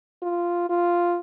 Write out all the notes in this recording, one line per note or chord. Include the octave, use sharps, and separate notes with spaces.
F4
F4